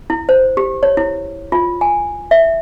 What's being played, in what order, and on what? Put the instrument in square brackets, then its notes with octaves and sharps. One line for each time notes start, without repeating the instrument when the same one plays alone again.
[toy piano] E4
C5
G4
C#5
E4
F4
G#5
E5